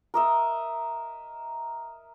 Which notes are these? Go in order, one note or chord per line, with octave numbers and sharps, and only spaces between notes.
A#4 D#5 E5